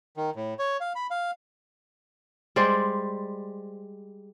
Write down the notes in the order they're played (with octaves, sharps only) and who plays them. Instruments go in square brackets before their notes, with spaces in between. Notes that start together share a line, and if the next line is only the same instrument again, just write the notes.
[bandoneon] D#3
A2
C#5
F5
B5
F5
[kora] G3 G#3 C5 D5